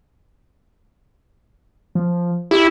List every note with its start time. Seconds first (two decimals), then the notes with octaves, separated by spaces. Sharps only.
1.95 F3
2.51 E4 G4